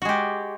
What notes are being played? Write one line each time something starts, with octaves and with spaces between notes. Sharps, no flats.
G#3 F#4 G4